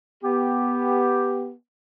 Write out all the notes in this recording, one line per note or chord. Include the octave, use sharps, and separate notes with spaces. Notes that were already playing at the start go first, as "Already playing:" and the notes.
B3 G4